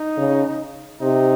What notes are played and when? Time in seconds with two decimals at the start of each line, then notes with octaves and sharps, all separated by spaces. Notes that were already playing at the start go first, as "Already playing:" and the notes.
Already playing: D#4
0.18 C#3
1.01 C3 D#4